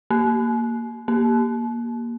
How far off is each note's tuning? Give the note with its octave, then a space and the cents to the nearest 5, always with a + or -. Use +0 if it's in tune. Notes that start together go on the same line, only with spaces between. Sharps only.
A#3 -5
A#3 +15